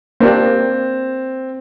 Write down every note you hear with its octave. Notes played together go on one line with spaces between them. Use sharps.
A#3 C4 D4 G4